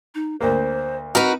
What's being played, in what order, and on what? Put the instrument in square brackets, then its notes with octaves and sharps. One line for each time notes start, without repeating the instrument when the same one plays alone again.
[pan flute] D#4
[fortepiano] D2 A#3 [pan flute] C5
[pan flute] C4 [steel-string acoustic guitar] D#4 F#4 [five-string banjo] A#4 B4